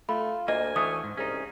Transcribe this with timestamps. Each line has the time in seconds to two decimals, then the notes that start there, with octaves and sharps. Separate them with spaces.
0.09 A3 F4 B5
0.48 D2 A#3 D#5 G#5
0.76 E3 A3 C#4 D#6
1.04 G#2
1.17 C2 C#4 D#4 G#4